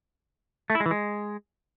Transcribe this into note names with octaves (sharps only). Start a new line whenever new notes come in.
A3
E4
G#3
E3
G#3